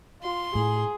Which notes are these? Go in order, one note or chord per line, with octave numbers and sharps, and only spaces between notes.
F4 C6
A2 G#4